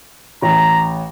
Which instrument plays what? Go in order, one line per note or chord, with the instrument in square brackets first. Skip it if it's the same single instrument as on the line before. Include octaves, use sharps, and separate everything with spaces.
[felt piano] A1 [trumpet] A#5